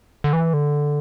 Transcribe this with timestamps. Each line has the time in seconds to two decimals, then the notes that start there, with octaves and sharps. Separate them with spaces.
0.24 D3
0.33 E3
0.53 D3